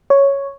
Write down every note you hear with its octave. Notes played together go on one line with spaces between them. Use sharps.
C#5